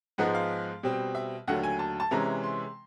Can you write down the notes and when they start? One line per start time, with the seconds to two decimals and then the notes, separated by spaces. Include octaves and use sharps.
0.18 G#2 F3 G#3 B3 D#4 F#5
0.35 F5
0.83 B2 G3 C4
1.15 E5
1.48 D#2 D3 F#3 A3 F#5
1.63 G#5
1.79 A5
2.00 A5
2.11 C3 E3 G#3 C#4 A#5
2.44 C6